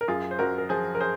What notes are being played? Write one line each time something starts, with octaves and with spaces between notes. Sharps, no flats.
A#4
F#2 F4 G#4
C5
F#2 F#4 A#4
A#4
F3 G#4 C5
A#4
G#4 C5